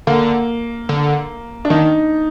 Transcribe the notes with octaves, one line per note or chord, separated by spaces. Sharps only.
D3 A#3
D3
D4
D#3 D#4